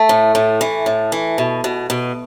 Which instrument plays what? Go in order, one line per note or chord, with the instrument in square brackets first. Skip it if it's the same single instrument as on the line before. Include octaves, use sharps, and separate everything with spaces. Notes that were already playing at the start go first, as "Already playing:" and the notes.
Already playing: [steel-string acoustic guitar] A3
A2
A2
E3
A2
E3
B2
B2
B2